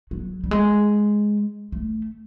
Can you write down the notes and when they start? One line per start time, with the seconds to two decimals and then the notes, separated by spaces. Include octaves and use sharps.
0.11 F#3
0.44 G3
0.51 G#3
1.72 A3